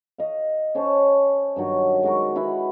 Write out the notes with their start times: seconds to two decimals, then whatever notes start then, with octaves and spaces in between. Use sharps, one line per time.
0.18 D#5 F5
0.75 C#4 C5 C#5 A5
1.56 G2 D#3 F#3
2.03 G#3 F#4 A#4
2.36 E4 B4 F#5 B5